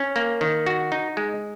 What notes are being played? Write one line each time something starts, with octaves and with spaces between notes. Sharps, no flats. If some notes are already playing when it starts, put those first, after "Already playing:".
Already playing: C#4
A#3
D#3
F#4
D#4
G#3